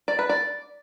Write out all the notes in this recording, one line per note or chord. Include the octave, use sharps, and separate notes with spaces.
D5
B4
D5